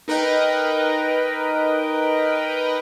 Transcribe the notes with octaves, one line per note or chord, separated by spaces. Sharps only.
D#4 A#4 B4 D#5 G5